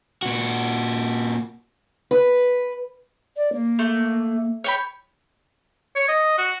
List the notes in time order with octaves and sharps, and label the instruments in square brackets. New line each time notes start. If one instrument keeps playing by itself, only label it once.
[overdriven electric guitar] A#2 F#4
[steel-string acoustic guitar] B4
[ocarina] D5
A#3
[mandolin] A3
C#5 G5 B5
[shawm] C#5
D#5
F#4